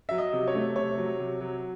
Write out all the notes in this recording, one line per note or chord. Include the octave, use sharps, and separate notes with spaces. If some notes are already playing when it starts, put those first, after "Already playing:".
F#3 E5
D#5
C3
C#5
A3
C3 C#5
F#3
C3
F#3